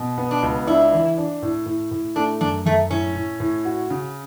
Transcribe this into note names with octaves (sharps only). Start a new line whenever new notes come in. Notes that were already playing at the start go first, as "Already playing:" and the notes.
Already playing: B2
B3
D4
C#2
D4 E4
E3
D4
A2
A2
A2
A3 D4
F#2 D4
F#2 A3
A2 C#4
A2
A2
F#4
C#3